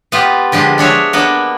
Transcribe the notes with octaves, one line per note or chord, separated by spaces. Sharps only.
B3 F4 G4
D3 F3 G#3 G4 G#4
G#3 D4 C#5 E5
A#3 B3 D4